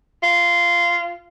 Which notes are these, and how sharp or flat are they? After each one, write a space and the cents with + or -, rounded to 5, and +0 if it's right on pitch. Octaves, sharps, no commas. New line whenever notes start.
F4 -15